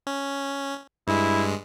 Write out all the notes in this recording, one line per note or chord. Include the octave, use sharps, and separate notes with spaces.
C#4
G2 G#3 E4